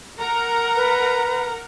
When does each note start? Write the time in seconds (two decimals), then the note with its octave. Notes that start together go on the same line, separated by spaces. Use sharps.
0.19 A#4 F#5 A#5
0.76 B4